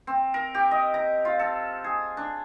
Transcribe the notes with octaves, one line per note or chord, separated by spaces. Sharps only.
C4
A#4
G4
D#5
A#5
F4
A4
G#4
D4